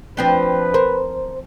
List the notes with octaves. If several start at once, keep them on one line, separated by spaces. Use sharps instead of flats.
F3 C4 D4 B4
A#4 C5